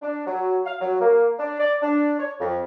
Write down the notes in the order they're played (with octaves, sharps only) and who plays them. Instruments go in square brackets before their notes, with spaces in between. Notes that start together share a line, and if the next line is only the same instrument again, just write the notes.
[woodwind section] D4
F#3
F5
F#3
A#3
D4
D5
D4
C#5
F2